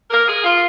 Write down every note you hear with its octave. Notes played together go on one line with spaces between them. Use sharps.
A#4
G#4
F4